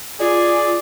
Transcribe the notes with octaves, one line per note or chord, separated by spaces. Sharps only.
F4 G#4 D5